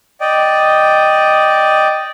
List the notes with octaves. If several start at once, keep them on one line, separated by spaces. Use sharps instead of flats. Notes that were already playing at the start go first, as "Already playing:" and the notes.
D5 D#5 G5